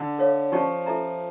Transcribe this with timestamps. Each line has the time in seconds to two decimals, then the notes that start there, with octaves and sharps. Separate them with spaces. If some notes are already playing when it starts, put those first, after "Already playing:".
Already playing: D3
0.19 A4 C#5 F5
0.52 F3 C#4 G4 D5 A5 C#6
0.86 F4 A4 E5 A#5